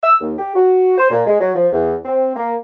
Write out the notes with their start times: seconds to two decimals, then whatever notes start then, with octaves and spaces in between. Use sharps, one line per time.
0.03 E6
0.21 D#2
0.39 G4
0.55 F#4
0.98 C5
1.11 A#2
1.27 G#3
1.40 F#3
1.55 F3
1.73 E2
2.05 C4
2.36 A#3